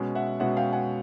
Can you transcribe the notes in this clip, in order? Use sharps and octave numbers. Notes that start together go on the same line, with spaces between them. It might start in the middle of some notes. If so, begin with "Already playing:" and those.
Already playing: B2 G#3 C#4
E5 F#5
B2 G#3 C#4 E5 F#5
F5 G5
F#5 G#5